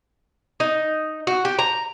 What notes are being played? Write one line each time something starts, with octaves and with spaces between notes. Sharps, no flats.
D#4
F#4
G4
A#5